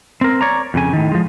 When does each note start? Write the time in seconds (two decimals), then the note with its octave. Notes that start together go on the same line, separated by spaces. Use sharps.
0.21 C4 A#4
0.41 C#5 D5 A#5
0.74 F2 C#3 G#5
0.93 A2 D#3
1.12 F3 G#3